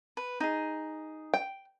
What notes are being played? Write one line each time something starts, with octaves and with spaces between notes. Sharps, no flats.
B4
D#4 G#4
G5